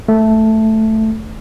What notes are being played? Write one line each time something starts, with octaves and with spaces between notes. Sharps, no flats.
A3